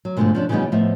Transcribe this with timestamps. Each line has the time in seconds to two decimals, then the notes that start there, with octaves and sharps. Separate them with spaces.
0.05 F#3
0.17 G#2 B2 D3 D#3 F3 A3
0.35 F3 C#4 D4
0.49 C#3 E3 F3 G3 B3 D#4
0.72 A2 F3 B3 D#5 E5